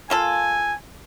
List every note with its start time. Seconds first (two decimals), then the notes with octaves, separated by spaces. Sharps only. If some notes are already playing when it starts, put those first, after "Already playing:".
0.10 A#3 F4 A4 G#5